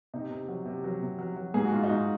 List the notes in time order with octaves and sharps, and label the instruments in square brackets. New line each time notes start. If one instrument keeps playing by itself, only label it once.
[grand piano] C3 D#4
C3
F#3
C3
F#3
C3
F#3
F#3
G#2 G#4
F#4
G#2 F4
D#4 F#4
G#2